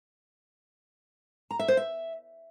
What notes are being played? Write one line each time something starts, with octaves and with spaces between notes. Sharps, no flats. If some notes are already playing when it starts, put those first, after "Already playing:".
A#5
E5
C5
E5